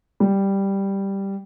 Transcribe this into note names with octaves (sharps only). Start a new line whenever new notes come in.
G3